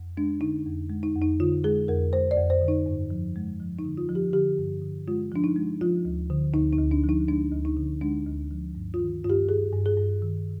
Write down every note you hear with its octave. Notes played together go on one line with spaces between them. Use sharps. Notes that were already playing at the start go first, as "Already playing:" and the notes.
Already playing: F2
G#3 D4
D3 D#4
F2
G#3
D#4
F2
D#4
D3 F4
G#3 G#4
F2 A#4
G#3 C5
D5
F2
C5
D3
D#4
G2
F3
G#3
F3
D#4
D3
F4
F3
G4
D3 G4
G2
D3
G#3 F4
F3 D4
D#4
G#3
F3 F4
D2
D3
D2 D#4
D#4
D2
D4
F3
D#4
G#3 D4
D2
D#4
D3
G#3 D4
D2
F3
G2
F4
D#3
G2 F4
G4
G2 G#4
G2
G#4
G2
D#3